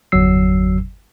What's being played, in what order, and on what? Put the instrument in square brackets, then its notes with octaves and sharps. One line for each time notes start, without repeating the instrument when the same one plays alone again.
[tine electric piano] G1 E2 F#3 E6 C7